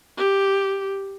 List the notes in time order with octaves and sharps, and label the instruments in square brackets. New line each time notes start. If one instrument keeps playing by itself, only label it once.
[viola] G4